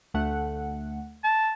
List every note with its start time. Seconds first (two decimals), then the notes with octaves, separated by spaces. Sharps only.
0.14 D2 A3 F#5
1.24 A5